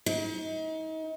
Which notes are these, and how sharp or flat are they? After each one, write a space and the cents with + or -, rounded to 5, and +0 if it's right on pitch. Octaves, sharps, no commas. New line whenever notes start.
D#4 +35